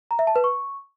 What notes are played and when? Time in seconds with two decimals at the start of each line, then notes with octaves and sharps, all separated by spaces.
0.11 A#5
0.19 E5
0.27 A5
0.36 B4
0.44 C#6